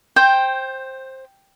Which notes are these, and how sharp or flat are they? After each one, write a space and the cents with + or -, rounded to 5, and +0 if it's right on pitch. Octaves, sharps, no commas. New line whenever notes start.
C5 +15 G5 +0